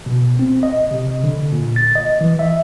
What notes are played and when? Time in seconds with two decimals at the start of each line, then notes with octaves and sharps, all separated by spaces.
0.06 B2
0.39 C4
0.63 D#5
0.91 C3
1.24 D3
1.52 A#2
1.76 A6
1.95 D#5
2.21 E3
2.39 E5